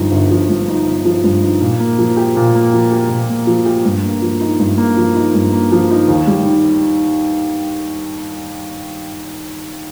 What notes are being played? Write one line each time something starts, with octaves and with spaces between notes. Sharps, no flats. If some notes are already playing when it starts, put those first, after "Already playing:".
Already playing: G1 G2 F3 D#4
G1
F3
G2
D#4
G1
F3
G2
D#4
A#2
A#3
F3
G4
A#2
A#3
F3
G4
A#2
A#3
F3
G4
G2
A#3
F3
D#4
G2
A#3
F3
D#4
G2
A#3
F3
D#4
D#2
G3
D#3